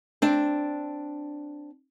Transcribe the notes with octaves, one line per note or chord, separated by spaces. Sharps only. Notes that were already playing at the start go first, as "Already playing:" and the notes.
C4 D4